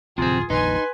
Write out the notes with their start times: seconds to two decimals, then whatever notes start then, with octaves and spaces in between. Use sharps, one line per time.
0.18 D1 A2 C3 F3 C4 F4 G#4
0.50 D#1 A#1 F2 D#4 B4 G#5 C6